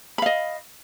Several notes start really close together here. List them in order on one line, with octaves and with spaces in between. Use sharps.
B5 F5 D#5